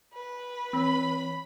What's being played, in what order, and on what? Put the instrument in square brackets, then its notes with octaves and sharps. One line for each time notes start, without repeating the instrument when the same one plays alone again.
[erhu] B4
[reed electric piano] E3 C#5 [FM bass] C4 [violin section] B5